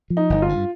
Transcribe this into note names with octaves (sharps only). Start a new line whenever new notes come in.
F3
D#4
G1 D#4
F4
G2